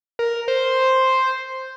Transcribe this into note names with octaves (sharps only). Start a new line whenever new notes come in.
A#4
C5